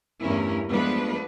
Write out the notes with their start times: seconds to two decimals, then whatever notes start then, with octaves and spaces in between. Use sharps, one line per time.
0.22 E2 G2 A3 C#4 E4 A#4
0.70 F3 G#3 A3 B3 D4 B4